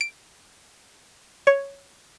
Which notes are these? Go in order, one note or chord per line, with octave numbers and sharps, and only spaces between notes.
D7
C#5